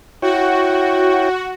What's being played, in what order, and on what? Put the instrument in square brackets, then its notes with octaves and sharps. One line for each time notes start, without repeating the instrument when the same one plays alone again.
[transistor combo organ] E4 C#5 G5 [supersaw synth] F#4